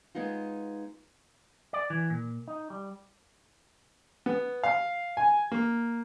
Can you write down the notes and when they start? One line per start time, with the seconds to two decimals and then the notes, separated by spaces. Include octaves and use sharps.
0.15 G#3 B3 D#4 F4
1.73 D5
1.90 E3
2.10 A#2
2.48 D#4
2.70 G3
4.26 B3
4.63 F5
5.17 G#5
5.52 A#3